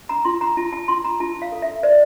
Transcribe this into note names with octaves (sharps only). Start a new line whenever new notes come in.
A#5
F4 C6
A#5
F4 A5
A5
F4 C6
A#5
F4 A5
F5
A4
E5
C5 D5